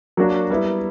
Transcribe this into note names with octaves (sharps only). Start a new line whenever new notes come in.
F#3 A#3 D4 F#4
G3 B3 E4